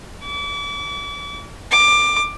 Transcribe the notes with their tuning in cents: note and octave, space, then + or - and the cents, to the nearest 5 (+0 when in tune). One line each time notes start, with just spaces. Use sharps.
D6 -40
D6 +15